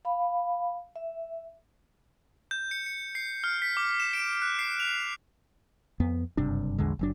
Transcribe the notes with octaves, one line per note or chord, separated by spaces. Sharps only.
F5 B5
E5
G6
C#7
C#7
C7
F6
B6
D6
E7
D7
F#6
C7
F7
F2 B3
F#1 G2 C3 D4
A#1 E2 D3 G#3
F#1 F#3 D4